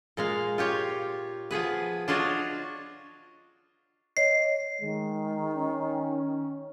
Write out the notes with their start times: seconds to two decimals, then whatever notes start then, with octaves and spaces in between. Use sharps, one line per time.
0.17 A#2 G#3 F5
0.58 F4 G4 C#5
1.51 F3 B3 G#4 B4
2.08 D4 F4 F#4 C#5 D#5
4.17 C#5 D#5 C7
4.81 D#3 G#3
5.56 C#4